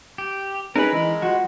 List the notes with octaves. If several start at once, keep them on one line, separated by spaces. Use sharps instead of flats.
G4
C#4 D#4 G#4 A#4 B4 B5
E3 G#3
F3 F#4